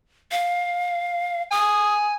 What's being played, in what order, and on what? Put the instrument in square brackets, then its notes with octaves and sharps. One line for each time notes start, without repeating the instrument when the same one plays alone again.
[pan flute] F5
[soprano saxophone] G#5 [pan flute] D#6